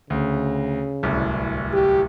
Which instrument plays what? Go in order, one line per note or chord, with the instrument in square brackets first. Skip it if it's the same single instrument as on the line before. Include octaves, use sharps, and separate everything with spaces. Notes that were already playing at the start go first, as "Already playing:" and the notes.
[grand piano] D2 [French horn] C#3
[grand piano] D1 C2
[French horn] G4